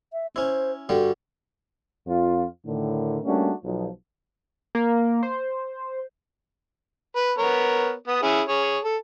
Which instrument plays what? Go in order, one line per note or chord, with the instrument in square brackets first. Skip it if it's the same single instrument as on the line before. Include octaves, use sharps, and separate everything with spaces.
[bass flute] E5
[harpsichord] C#4 E4 [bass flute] C5
[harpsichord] G2 D3 G3 [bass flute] F#4
[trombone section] F2 F4
A2 D3 D#3
G3 A3 A#3 C#4 D4 F#4
B1 F3
[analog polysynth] A#3
C5
[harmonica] B4
B3 A#4 C#5
B3 D#6
C#4 E4 G#4
G#4 C#5
A4